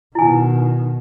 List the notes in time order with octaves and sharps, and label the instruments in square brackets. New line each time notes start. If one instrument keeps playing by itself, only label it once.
[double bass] B2 D#3 [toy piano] E4 G#5